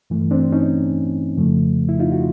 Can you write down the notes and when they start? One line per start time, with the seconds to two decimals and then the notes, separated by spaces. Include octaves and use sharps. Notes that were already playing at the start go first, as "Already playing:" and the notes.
0.10 G2 E3 A3
0.31 C4 D4
0.52 C#4 D#4
1.36 F2 C#3 F3 A3
1.89 E4
1.99 D#4 F4
2.12 F#4